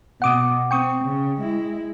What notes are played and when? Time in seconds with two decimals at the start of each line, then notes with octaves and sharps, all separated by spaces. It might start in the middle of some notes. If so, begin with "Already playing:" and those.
0.22 B2 F#5 D6 D#6
0.71 C4 G5 C#6 D#6
1.04 C#3
1.40 G#3 E4